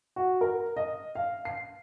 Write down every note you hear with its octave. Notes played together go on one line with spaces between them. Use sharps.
F#4
A#4
D#5
F5
C7